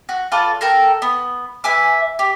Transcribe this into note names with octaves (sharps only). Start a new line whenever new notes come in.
F#4
F4 A4 B4 D5
A4 A#4 G5 A#5
B3
B4 E5 G#5 D6
G4